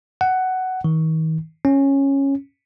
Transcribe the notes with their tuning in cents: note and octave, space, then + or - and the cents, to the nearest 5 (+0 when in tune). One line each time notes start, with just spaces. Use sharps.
F#5 +10
D#3 +40
C#4 -10